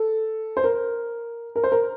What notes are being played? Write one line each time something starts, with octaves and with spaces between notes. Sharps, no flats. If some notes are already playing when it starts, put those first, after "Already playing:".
Already playing: A4
C5
A#4
A#4
C5
A#4